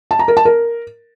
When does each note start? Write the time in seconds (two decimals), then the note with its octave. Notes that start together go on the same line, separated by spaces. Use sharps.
0.11 A5
0.19 A#5
0.28 A#4
0.37 A5
0.45 A#4